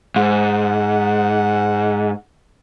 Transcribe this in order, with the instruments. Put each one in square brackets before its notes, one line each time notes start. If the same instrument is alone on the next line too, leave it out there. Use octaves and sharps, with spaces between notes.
[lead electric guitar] G#2 [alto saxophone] F#5